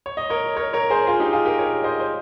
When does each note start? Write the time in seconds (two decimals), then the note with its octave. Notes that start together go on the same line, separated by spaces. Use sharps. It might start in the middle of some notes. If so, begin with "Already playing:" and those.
0.06 C#5
0.17 D#5
0.30 A#4 C#5
0.57 A#4 C#5
0.73 A#4 C#5
0.90 G#4 C5
1.07 F4 G#4
1.20 D#4 G4
1.33 F4 G#4
1.45 G4 A#4
1.59 A#4 C#5
1.84 C5 D#5
2.00 C5